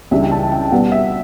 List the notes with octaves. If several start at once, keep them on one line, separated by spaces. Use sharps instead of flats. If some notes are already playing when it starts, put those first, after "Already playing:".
C#2 C#3 E3 G3 D4 E5
G5
A5
G5
B2 G3 B3 F#5
E5